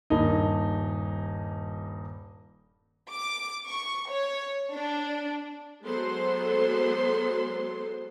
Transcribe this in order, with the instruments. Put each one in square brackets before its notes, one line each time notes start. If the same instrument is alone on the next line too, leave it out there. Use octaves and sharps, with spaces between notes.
[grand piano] D#1 G2 A#3 D#4
[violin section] D6
C#6
C#5
D4
[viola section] F#3 G#3 B3 A4 C5 C6